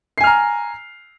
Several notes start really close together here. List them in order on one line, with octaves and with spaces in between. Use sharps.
C7 G#5 F6 A#5